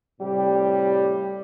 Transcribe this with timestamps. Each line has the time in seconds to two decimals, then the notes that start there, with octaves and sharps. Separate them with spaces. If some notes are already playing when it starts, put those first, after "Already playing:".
0.21 A2 C3 G3 G4